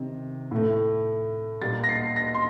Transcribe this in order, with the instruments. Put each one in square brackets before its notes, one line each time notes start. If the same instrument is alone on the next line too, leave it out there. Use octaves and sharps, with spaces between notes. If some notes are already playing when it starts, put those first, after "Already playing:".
Already playing: [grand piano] C3 D#3
A2 A3
A#2 G3 A#3 A6
A#6
C7
A#6
C6